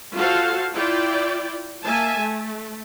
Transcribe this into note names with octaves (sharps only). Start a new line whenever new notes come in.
F4 F#4 A4 C5 F5
E4 F4 D5 G5
A#3 E5 G#5 A5
A3